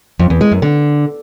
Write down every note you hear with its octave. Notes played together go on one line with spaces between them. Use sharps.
F2
E2
G#3
F#2
D3